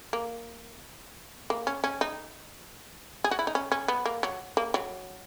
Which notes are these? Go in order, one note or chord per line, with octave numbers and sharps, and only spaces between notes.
A#3
A#3
C#4
C#4
D#4
G#4
F#4
E4
D#4
C#4
C#4
B3
A#3
F#3
A#3
F#3